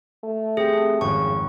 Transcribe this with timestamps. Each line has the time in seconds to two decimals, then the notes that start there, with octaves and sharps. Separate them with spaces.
0.24 A3
0.57 C4 G4 G#4
1.01 G#1 F2 C#3 C#6